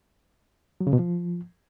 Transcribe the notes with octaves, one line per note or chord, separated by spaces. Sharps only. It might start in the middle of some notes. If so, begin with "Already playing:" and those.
F#3
C#3
B2
F3